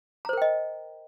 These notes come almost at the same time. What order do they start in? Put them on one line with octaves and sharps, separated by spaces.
A#5 C5 A#4 G5 D#5